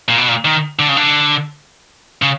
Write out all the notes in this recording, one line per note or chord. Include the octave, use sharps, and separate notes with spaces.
A#2
B2
A#2
D#3
D3
C#3
D3
C#3